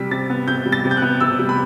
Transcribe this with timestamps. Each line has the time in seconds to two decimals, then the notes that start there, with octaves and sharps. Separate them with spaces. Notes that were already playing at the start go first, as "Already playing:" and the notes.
Already playing: C3 G3 B6
0.11 C3 A6
0.30 B3
0.47 C3 G6
0.65 G3
0.72 A6
0.85 C3
0.91 G6
0.97 B3 F#6
1.20 C3 E6
1.39 G3
1.49 B5